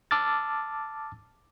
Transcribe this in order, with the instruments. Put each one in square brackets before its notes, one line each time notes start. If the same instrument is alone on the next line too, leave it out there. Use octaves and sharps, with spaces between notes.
[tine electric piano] A5 D6 E6 F6 A6